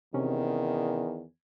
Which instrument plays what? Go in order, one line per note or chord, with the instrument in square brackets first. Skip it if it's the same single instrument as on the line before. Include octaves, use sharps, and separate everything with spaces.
[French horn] E2 [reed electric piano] C3 C#4 [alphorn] D#3